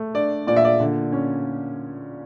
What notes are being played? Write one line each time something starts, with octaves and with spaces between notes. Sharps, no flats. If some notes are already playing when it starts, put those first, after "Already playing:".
Already playing: A3
D4 D5
A#2 D5
E5
D5
D3
C#4